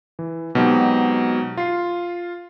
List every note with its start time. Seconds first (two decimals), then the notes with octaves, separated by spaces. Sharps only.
0.19 E3
0.55 B2 F#3 G#3 C4 D#4 G4
1.57 F4 C7